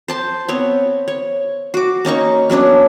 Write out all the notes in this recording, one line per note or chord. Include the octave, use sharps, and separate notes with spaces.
C5 A5 C6
B3 C4 C#5
C#5
F#4 D6
A#3 C#4 D#4 C#6
F#3 B3 C#4 D4